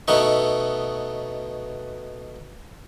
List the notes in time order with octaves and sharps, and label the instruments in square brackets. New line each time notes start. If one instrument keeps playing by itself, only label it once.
[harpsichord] B2 A3 B3 D#4 C#6